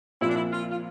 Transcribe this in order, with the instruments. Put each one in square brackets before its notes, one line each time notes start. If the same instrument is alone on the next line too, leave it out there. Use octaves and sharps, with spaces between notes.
[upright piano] A#2 F3 C4 F4 [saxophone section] E4
[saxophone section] D4
E4
F4
F4